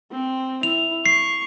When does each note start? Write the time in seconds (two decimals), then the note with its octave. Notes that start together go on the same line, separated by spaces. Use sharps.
0.11 C4
0.63 E4 F7
1.06 C#6 C7